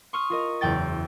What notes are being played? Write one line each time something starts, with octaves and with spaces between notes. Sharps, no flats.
C6 C#6 D#6 F6
F4 A#4 D#5
F#1 E2 G5 A6